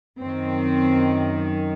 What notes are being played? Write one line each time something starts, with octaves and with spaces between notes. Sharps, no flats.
F#2 D#3 C4